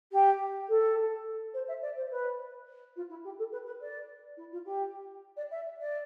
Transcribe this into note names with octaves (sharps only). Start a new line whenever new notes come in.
G4
A4
C5
E5
D5
C5
B4
F4
E4
G4
A4
B4
B4
D5
E4
F4
G4
D5
E5
D5